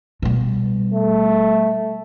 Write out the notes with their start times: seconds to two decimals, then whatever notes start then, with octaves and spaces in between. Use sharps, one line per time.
0.22 B2 G3
0.94 A3